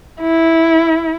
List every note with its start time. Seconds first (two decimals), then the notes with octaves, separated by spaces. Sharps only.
0.21 E4